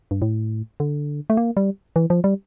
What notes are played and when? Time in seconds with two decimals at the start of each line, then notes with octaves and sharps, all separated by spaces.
0.11 G2
0.22 A2
0.80 D3
1.30 A3
1.37 A#3
1.57 G3
1.96 E3
2.10 F3
2.24 G3